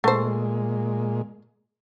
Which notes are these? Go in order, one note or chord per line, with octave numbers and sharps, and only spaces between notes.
A#2 G#3 A3 C5